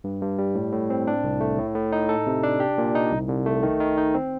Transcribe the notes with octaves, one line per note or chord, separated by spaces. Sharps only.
G2
G2
G3
A2
A2
C4
D4
C2
A3
A2
A2
D#4
A4
C3
D4
G4
A#2
D#4
C2
C2
A3
D#3
D#3
D#4
C4